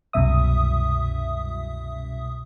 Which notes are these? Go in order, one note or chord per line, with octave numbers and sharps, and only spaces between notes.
C2 F#2 B2 E5 D#6